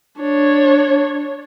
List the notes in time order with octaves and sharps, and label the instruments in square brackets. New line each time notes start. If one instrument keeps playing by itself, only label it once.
[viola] D4 C#5